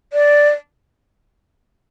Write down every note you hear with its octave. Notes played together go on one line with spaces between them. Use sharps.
D5